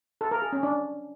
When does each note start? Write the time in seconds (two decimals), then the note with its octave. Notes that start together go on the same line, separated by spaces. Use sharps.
0.21 A4
0.31 A#4
0.42 G#4
0.52 C#4
0.63 D4